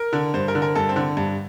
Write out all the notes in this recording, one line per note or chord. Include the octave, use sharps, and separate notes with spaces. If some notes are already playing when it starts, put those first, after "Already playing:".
Already playing: A#4
D3
G2 C5
A#4
D3
A#4
G2 A4
C4
D3
G2